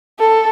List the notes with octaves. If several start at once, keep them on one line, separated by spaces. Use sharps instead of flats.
A4